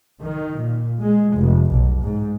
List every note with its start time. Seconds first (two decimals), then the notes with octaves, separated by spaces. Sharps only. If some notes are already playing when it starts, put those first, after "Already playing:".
0.20 D#3
0.59 A#2
1.01 G#3
1.35 F1
1.70 B1
2.00 G#2